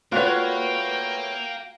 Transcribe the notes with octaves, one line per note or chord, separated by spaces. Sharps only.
A3 F4 F#4 A#4 B4 C#5 F5 G5